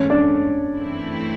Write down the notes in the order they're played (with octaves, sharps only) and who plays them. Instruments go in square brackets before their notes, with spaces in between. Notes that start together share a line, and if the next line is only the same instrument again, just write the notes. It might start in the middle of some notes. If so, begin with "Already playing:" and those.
Already playing: [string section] G#2 E3 A3 [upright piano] C#4 C#5
[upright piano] D4 D5
[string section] G2 E3 A3 C4 E4